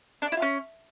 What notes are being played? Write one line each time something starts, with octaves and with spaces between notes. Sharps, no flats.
D4
D5
E4
F4
C#4